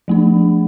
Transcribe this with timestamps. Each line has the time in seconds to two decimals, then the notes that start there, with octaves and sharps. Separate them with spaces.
0.08 F3 A3 D4